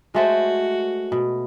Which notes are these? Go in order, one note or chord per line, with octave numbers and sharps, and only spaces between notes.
G#3 A3 F#4 C5
B2